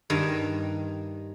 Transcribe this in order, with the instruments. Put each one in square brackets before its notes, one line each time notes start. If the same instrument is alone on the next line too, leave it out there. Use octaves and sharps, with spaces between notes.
[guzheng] G2 D#3